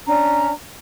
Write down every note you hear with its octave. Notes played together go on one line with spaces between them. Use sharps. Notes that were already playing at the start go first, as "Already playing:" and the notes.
C#4 D4 A#5